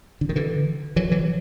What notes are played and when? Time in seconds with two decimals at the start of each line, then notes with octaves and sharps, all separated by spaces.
0.21 D3
0.29 D#3
0.36 D3 E3
0.96 E3 F#3
1.11 E3 F#3